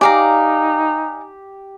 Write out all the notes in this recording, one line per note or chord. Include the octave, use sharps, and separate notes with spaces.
D#4 G4 D5 F5 G#5 A#5